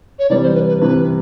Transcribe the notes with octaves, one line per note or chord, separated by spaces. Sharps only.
C#5
C3 E3 G3 D5
C5
B4
B4
C3 E3 G3 B4